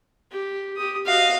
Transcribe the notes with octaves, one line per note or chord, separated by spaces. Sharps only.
G4
G4 D#6
F#4 D#5 F5